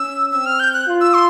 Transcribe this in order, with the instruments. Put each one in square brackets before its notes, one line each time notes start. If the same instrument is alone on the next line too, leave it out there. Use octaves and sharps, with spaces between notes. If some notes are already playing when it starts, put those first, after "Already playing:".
Already playing: [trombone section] C#4 [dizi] E6
[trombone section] C4 [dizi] E6
[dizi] F6
G6
F#6
[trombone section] F4
[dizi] E6
C6